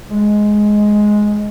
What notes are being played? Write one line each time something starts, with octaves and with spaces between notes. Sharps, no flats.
G#3